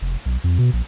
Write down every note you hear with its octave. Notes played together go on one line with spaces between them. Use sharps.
F1
B1
F2
B2
A#1